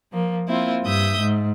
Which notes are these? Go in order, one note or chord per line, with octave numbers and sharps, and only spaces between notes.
F3 A#3
A#3 C4 E4 F4
G2 E5 D#6 G6
G#2